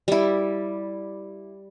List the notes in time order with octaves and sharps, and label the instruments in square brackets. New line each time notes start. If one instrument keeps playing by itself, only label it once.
[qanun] G3 E4